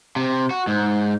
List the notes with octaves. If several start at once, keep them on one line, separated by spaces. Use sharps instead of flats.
C3
F#4
G#2